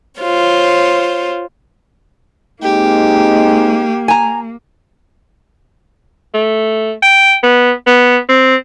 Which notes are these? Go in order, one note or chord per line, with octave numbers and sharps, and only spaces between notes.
F4 C5 C#5
G#3 A#3 C4 D#4 G4
G#5 A#5
A3
G5
B3
B3
C4